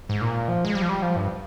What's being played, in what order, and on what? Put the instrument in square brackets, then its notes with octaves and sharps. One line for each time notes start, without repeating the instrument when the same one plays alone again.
[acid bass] G#2
A#2
F3
G#3
G3
F3
G3
F3
G2